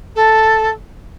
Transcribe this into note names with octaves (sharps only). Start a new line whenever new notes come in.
A4